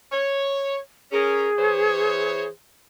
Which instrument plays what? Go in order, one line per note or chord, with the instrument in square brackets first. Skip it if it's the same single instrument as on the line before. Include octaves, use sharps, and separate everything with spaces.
[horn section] C#5
[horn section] C#4 A#4 [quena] G#4
[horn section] E3 C5 C#5